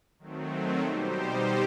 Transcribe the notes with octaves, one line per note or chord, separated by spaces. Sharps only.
D#3 F#3 A3 C4
B2 G3 D#4 G4 C5